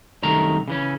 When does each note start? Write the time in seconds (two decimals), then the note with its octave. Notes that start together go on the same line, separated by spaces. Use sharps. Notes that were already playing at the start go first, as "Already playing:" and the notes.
0.23 C2 F#2 D#3 A3 A#5
0.68 C#3 E3 C#4